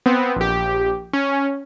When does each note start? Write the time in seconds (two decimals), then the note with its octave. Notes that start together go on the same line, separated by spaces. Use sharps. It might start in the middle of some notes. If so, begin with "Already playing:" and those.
0.06 B3 C4
0.36 A#1 G4
1.13 C#4